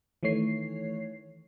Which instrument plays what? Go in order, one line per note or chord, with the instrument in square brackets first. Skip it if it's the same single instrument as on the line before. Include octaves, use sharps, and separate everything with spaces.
[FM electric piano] D#3 E3 A3 C#5 C7